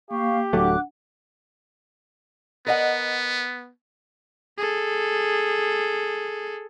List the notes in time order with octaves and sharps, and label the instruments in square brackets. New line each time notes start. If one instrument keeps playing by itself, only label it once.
[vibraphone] A#3 [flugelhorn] G4 [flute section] F5 C#6
[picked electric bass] D1 F#3 A3 [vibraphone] D4 F#5 [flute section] D6 F#6
[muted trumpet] B3 [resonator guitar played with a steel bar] A#4 D#5 F#5
[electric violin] G#4 A4